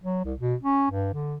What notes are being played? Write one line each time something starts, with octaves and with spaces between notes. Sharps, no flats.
F#3
C2
B2
C#4
G2
D3